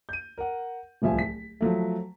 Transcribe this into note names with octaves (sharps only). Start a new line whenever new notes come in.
G6 D#7
A#4 F#5
D1 C2 F3 E5 G#5
B6
F3 F#3 A3